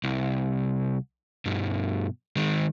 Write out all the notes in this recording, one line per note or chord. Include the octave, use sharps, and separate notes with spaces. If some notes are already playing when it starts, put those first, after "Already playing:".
C2
G2 B2
D#3 G#3